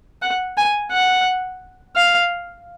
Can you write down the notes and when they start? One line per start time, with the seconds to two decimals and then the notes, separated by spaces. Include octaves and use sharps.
0.22 F#5
0.57 G#5
0.92 F#5
1.96 F5